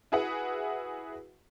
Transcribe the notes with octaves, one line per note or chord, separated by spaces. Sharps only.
E4 F#4 G#4 B4 E5 F#5